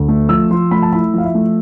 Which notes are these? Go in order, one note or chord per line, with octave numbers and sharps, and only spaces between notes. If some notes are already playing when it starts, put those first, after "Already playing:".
Already playing: D2
A3
F3 E6
F3 C6
A3 B5
A5
E4 B5
F3 F5
E5
A3